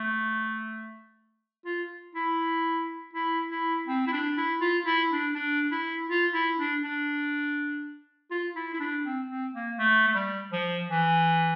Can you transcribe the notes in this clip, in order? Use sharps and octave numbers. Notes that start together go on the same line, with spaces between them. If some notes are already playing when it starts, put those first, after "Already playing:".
Already playing: A3
F4
E4
E4
E4
C4
E4
D4
E4
F4
E4
D4
D4
E4
F4
E4
D4
D4
F4
E4
E4
D4
C4
C4
A#3
A3
A3
G3
F3
E3